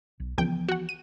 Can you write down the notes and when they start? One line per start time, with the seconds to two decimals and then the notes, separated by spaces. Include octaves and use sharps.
0.20 B1
0.38 C#2 E3 F3 B3 G5
0.69 F#4 F#5
0.89 D#7